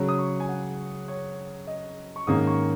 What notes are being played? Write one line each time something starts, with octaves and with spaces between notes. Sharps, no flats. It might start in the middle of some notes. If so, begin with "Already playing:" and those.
Already playing: C#3 F#3 C#4
D#6
C#6
G#5
F#5
C#5
D#5
C#6
G#2 D#3 A#3 C#4 D#6
C#6